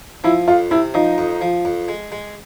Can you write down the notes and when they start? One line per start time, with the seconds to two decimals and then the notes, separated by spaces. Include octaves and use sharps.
0.24 F3 E4
0.48 F2 F4
0.71 C3 E4
0.94 F3 D#4
1.18 F2
1.41 F3
1.65 F2
1.88 G#3
2.12 G#3